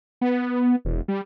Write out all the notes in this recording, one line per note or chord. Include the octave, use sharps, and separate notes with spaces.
B3
E1
G3